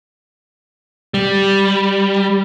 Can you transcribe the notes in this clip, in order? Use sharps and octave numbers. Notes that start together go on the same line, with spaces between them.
G3